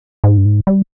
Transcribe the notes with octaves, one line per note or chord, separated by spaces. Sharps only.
G#2
G2
G#2
G3